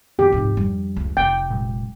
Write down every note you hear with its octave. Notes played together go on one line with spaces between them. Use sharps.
F2 B2 D#3 G4
D#1 G#2 C3 F3 D#4
F2 G3 D4
C#2
F1 G5
A#2 F#3 G#3